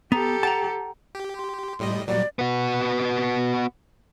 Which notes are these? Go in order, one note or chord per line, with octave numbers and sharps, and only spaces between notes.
B3 G4 A4 A#5
F#5 G5 A5 A#5
G4
C6
A2 G3 D#5
A#2 F#3 G3 D5
B3 F#4